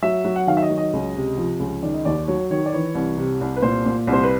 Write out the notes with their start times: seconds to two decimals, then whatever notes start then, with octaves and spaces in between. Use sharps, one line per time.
0.02 F#3 E5
0.25 F#3
0.36 F#5
0.47 D#3 F5
0.57 E5
0.62 D#5
0.70 F#3
0.77 D#5
0.93 C#2
1.16 C3
1.37 F3
1.60 C#2
1.83 D#3 D5
1.94 D#5
2.05 D#2 D5
2.27 F#3 C#5
2.50 D#3 C#5
2.66 D5
2.73 E3 C#5
2.95 C2
3.17 C3
3.41 C2
3.56 B4
3.62 A#2 C5
3.86 A#2
4.07 C2
4.13 C5
4.24 B4